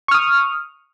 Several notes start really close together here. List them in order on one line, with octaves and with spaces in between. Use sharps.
C#6 F6 D#6